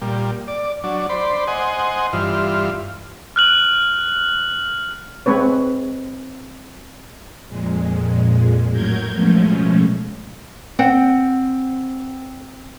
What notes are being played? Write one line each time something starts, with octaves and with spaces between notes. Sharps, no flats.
A#2 G3
D5
F#3 D4
C5 D5 B5
C5 D#5 F#5 G#5
G2 E3 F4
F6 F#6 F#7
G#3 C4 B4 C#5
F2 A#2 G#3
A2 F#3 A#4 G6 G#6
B2 F3 G#3 A3 C#4
C4 F#5 G5